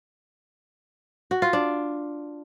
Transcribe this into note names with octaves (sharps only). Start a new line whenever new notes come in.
F#4
F4
D4